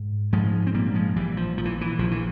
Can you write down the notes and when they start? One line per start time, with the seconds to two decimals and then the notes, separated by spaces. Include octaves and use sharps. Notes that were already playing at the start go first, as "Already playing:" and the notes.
Already playing: G#2
0.32 G#2 F3 G#3
0.67 C4
0.74 A#2 G3 A#3
0.95 F3 G#3
1.16 A#1 E3 G3
1.37 F3
1.58 A#2 F3
1.65 E3
1.81 E3
1.98 A#1 F3
2.11 E3